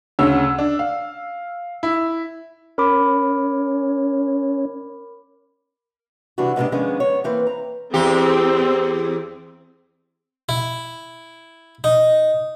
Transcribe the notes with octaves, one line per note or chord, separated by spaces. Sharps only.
D2 C#3 C#5 E6
D4
F5
E4
C#4 A#4 B5 D6
C3 E3 G3 D4 F#4
G#2 C3 G3 G#3 B3 D4
D#3 F3 G#3 B3 C#4 D4
B3 C#5
E3 A#3 C4 B4
A#5
E2 C4 G4
E4
D#4